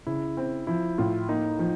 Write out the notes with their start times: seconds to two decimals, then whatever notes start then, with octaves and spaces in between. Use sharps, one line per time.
0.07 C#3 E4
0.37 C4
0.67 F3 E4
0.98 A2 F4
1.29 A#3 D#4
1.59 F3